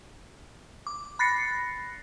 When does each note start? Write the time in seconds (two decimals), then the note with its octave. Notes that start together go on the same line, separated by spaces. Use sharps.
0.87 D6
1.19 B5 F#6 A6 A#6 C7 C#7